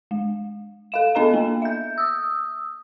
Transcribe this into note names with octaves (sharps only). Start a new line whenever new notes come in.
G#3
A4 F5 E7
B3 D4 A4 D#5 A#5 E7
A#3
E5 G6
D#6 E6